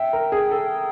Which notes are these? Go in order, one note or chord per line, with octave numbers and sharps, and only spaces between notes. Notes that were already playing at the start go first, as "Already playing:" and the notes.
Already playing: E5 G5
A#4
G#4
A4